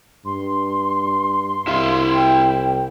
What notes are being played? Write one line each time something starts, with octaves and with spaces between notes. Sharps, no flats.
G2 C6
C2 E4 E5 F5
G5